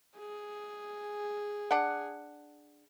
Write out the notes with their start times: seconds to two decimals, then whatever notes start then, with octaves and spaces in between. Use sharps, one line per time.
0.19 G#4
1.71 D4 F#5